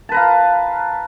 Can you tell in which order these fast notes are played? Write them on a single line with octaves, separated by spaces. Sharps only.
A5 B4 A#5 F5